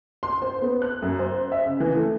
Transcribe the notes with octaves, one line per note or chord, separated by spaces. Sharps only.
C6
C5
B3
F#6
F#2
C5
E5
C#3
E3
A3